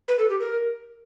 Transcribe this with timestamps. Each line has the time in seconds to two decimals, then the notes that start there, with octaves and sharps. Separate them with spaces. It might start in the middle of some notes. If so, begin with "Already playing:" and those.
0.08 B4
0.19 A4
0.29 G4
0.40 A#4